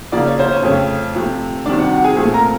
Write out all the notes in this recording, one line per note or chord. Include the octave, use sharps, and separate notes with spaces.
C#3 F3 A#3 D5
C#5
C5
C#4 C#5
F2 C#3 F3 A3 C4
C3 F3 A3 C4
C3 D#3 G3 D4 D5
F#4 F#5
F#4 F#5
G#4 G#5
A#2 F3 A3 C4 G#4 G#5
A#4 A#5